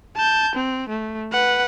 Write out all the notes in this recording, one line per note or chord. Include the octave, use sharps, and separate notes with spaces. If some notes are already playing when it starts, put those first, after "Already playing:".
A5 G6
C4
A3
B4 F#5